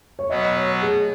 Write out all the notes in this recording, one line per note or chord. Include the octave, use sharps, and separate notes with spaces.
C#5
B2 F#3 B3 F#4 D#5
C#5
G#4